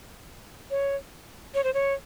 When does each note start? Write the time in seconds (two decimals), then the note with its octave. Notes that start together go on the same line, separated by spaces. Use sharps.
0.71 C#5
1.55 C#5
1.64 C5
1.74 C#5